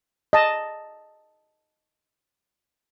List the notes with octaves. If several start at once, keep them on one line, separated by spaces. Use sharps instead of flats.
D#5 A5